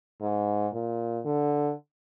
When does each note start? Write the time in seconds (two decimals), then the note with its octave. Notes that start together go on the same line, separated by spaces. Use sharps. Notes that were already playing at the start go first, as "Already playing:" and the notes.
0.21 G#2
0.73 A#2
1.25 D3